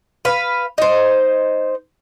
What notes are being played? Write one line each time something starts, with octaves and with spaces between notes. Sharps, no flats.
B4 F5
D#4 C5